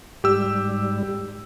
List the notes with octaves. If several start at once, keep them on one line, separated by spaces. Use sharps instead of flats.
G#2 G3 G4 E6